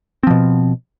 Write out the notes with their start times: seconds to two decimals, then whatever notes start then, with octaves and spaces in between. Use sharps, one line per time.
0.23 C4
0.27 F3
0.30 B2